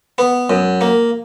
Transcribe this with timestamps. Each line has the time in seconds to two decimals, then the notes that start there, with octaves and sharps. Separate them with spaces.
0.18 B3
0.50 F#2
0.81 A#3